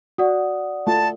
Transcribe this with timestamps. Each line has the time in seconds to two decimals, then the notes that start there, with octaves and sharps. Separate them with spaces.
0.18 F#4 D5 F#5 D#6
0.87 A3 F4 A5